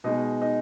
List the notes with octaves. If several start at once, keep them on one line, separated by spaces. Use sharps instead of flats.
B2 G#3 D#4
D#4